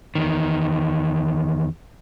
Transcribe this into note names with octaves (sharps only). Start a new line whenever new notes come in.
E2 D#3